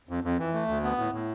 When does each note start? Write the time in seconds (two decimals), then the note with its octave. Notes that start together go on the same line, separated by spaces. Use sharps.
0.09 F2
0.24 F2
0.39 E3
0.54 A3
0.68 D2
0.83 B3
0.98 A2
1.13 A2